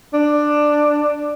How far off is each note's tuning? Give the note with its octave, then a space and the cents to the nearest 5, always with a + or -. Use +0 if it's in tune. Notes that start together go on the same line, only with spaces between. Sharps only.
D4 +10